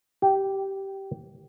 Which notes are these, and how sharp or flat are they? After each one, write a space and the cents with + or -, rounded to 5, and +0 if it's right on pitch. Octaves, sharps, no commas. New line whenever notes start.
G4 -10